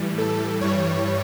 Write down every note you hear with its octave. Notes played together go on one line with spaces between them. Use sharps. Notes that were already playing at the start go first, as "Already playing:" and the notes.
Already playing: A2 E3 G3
A4
G2 E3 G3 C#5